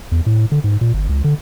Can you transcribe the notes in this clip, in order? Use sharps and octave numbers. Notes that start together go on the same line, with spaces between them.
E2
A2
D3
G#2
A#2
G1
C#2
D3